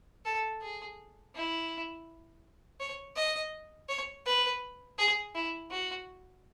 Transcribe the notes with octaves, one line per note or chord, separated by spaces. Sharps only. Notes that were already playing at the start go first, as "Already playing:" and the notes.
A4
G#4
E4
C#5
D#5
C#5
B4
G#4
E4
F#4